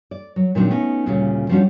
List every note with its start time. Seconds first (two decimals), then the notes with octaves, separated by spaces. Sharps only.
0.11 D5
0.36 F#3
0.55 A#2 D#3 F#3 G3 C4 D4
0.70 A3 B3 C#4 D#4
1.06 D2 A#2 C#3 G3 C#4
1.49 F3 G3 B3 C#4 D4 F#4